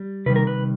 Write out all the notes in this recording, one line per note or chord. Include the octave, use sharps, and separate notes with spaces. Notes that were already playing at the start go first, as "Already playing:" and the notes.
Already playing: G3
C3 D#3 G3 B4
A#4
B4